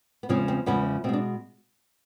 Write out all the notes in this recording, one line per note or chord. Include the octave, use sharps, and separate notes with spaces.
B3
E2 C#3 F3 G#3 C4
C4
E2 C#3 F3 G#3 B3
B2 G#3 C4 D4